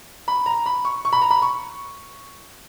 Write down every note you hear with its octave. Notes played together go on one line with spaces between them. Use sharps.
B5
A#5
B5
C#6
C#6
B5
A#5
B5
C#6